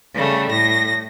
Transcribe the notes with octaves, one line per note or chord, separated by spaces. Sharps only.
C#3 G3 A3
A2 A#6